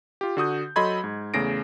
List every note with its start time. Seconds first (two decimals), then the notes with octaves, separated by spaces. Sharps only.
0.21 F4 G4
0.37 D3 F#4 D#6 G6
0.76 F#3 A4 D#5 B5 C6 G#6
1.04 G#2
1.34 E2 C#3 A3 A#6 C7 D7